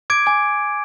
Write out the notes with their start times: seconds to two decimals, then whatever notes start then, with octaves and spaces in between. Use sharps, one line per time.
0.10 D6 G#6 D7
0.26 G#5 D6